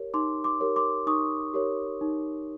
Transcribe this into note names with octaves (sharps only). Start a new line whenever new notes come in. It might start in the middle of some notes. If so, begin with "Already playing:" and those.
Already playing: G4 A#4 C#5
D#4 C6 D6
C6 D6
G4 A#4 C#5
C6 D6
D#4 C#6 D#6
G4 A#4 C#5
D#4